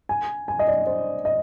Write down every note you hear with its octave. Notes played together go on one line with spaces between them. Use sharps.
G#5
G#5
D#5
D5
C5
D#5